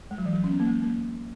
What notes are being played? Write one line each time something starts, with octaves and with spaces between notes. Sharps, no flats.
G#3
F#3
E3
F#3
C#4
B3
A#3
G#3
A#3